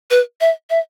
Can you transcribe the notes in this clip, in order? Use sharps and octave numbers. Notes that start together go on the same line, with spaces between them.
B4
E5
E5